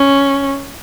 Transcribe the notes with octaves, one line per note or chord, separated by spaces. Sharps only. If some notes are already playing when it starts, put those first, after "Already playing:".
Already playing: C#4